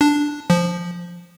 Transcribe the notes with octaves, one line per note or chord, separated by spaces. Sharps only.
D4
F3